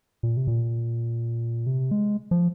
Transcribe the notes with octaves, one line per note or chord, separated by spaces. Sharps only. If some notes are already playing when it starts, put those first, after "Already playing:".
A#2
C3
A#2
C3
G#3
F3